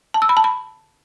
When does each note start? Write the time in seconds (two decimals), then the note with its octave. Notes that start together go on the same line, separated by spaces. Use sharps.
0.14 A5
0.22 E6
0.29 B5
0.37 A5
0.44 B5